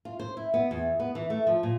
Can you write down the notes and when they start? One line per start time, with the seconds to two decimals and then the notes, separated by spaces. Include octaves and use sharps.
0.05 F4
0.20 C5
0.37 E4
0.54 B3
0.71 E2
1.00 B3
1.15 E3
1.30 A3
1.47 F3
1.63 A#2